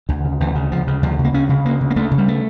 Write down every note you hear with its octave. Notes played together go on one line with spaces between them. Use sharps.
D2 D3
C#3
D2 E3
C#3
D2 F3
C#3
D2 F3
C#3
A#3
D2 C#4
C#3
D2 A#3
C#3
A#3
D2 A3
C#3
G3
A3